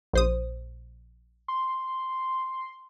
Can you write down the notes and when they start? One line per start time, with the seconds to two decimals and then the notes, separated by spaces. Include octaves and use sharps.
0.13 A#1 C5 D#6
1.48 C6